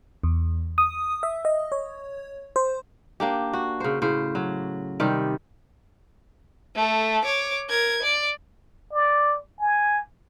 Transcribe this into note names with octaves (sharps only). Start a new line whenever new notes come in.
E2
D#6
E5
D#5
C#5
C5
A#3 D4 G4
F#4
C#3 C5
A2 C#3 C5
F#3
C3 D#3 G3
A3 A4
C#5 D6
A#4 G#6
D5
D5
G#5